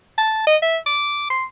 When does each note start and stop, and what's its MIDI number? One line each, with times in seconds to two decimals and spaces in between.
0.18 0.47 81
0.47 0.57 75
0.62 0.78 76
0.86 1.29 86
1.30 1.45 84